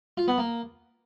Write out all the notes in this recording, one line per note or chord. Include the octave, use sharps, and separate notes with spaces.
F4
B3
A#3